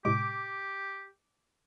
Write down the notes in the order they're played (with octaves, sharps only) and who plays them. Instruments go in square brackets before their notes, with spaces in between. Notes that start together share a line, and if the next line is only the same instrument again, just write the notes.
[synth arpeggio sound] A2 C3 G#3 [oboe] G4 [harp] D6